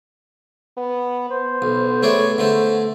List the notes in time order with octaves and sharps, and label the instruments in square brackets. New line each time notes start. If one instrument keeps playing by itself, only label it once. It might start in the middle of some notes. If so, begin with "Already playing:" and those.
[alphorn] B3
[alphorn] B3 [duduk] C5
[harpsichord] B1
[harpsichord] A3 G#4 D5 [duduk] C#5
[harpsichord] D3 A3 A4 [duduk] C5